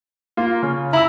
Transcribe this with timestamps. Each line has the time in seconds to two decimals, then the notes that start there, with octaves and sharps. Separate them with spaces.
0.37 A#3 F4
0.63 C#3
0.93 E4 A#5 E6